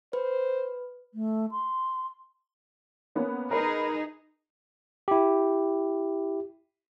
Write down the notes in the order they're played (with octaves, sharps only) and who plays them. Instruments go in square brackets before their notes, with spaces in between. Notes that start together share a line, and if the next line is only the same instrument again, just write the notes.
[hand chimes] B4 [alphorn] C5
[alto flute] A3
C6
[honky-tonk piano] A#3 B3 C#4
[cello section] D#4 G#4 [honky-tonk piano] A#4 B4
[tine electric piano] E4 G4